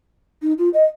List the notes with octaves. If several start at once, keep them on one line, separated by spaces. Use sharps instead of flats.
D#4
F4
D#5